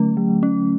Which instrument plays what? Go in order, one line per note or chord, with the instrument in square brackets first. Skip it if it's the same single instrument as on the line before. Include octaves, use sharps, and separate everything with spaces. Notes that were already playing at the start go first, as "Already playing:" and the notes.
Already playing: [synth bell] D3 F#3 A3 C#4
F#3
C#4